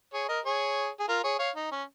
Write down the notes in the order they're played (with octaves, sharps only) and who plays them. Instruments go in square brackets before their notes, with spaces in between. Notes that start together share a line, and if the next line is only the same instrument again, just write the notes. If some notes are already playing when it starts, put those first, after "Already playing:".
[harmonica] G#4 C#5
A#4 D#5
G#4 C#5
G#4
F4 A#4
G#4 C#5
C#5 F5
D#4
C#4